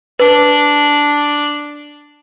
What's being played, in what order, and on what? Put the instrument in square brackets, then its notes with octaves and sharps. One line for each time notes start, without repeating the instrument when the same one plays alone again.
[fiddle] D4 [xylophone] B4